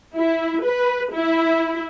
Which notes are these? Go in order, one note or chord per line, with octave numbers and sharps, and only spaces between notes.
E4
B4
E4